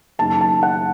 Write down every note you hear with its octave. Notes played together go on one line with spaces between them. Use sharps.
F#1 F#2 D#3 F#3 A5
A5
F#5